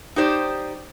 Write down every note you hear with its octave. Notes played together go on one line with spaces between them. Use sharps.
D#4 G4 C5 D5